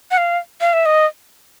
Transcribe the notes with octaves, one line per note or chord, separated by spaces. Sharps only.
F#5
F5
F5
E5
D#5